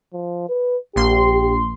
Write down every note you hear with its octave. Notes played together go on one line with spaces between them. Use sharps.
F3
B4
A#1 G4 C6